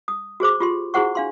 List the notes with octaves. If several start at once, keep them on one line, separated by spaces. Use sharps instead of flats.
D#6
F#4 G#4 C5 D6
F4 G4 C6
E4 F#4 G#4 C5 F#5 C#6
D4 F5 C6